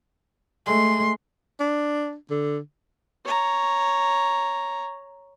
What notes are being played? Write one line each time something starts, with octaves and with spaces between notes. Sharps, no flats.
G#3 A3 C6
D4
D3
C#5 A#5